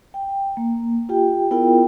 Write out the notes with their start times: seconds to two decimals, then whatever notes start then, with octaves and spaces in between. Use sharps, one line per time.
0.14 G5
0.57 A#3
1.09 F4 G4 G5
1.51 B3 E4 F4 G#4 A#4 G5